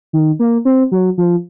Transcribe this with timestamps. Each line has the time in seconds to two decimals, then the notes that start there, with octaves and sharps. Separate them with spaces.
0.13 D#3
0.39 A#3
0.65 C4
0.92 F#3
1.18 F3